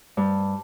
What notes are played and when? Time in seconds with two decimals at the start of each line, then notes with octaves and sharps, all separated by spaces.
0.17 G2